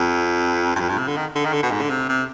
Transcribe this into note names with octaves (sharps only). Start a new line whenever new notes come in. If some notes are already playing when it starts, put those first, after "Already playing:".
Already playing: F2
G2
F2
G2
C3
D3
D#3
D3
D#3
D3
B2
G#2
D3
C3
C3